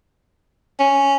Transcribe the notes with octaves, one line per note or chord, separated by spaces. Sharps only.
C#4